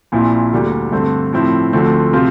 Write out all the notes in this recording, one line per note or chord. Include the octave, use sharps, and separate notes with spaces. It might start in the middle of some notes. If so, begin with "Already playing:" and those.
A#1 A#2 F3 C4 E4
D2 D3 G3 A#3
G2 D3 A3 C4
A2 F3 C4 E4
D2 D3 F3 A3 C4
C3 F3 C4 F4